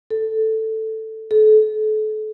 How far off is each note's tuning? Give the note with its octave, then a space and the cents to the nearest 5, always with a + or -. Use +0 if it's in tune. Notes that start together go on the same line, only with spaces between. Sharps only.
A4 +5
A4 -35